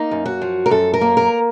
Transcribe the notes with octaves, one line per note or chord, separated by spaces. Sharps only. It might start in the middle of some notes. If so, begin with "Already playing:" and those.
Already playing: A#3 D#4
F#2
F#4
F3
A#4
F#2 A4
A#4
A#3
A#4